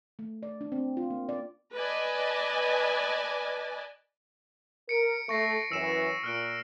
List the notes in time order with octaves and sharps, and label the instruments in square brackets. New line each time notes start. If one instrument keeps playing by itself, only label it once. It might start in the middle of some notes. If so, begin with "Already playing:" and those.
[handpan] A3
D5
D4
C4
F4
A#3
D5
[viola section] B4 D5 D#5 G#5 A5
[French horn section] A#4 [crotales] C#7 D7
[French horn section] A3 [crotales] C#6 A#6 C7
[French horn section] F#2 E3 [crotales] E6 E7
[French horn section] A#2 [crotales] F6 F#6 D7